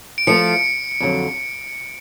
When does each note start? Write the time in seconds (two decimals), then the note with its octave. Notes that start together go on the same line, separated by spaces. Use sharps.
0.18 D7
0.27 F3 A3 F4 C#7
1.00 F2 D3 F#3